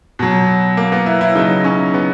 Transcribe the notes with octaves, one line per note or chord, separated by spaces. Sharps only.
B2 F#3
A#3
B3
E4
E4
C#3 F#3 D#4
C#4
B3